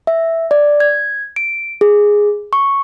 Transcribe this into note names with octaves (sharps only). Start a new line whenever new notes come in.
E5
D5
G#6
D7
G#4
C#6